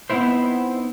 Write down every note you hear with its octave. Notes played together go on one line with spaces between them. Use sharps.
B3 C4 D#4 E4 C5